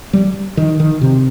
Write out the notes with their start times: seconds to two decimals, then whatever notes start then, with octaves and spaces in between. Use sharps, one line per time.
0.13 G3
0.57 D#3
0.80 D#3
1.01 C3